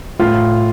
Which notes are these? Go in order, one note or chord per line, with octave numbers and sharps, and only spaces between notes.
A2 F4 F5